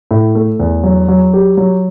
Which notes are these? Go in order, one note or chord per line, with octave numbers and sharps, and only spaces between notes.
A2
A3
E2
F#3
F#3
G4
F#3